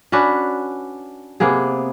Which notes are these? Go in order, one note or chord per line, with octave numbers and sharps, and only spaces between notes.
C#4 D4 F#4 B4
C3 A#3 B3 G#4